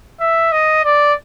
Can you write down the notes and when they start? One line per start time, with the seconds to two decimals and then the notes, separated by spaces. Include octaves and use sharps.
0.20 E5
0.52 D#5
0.85 D5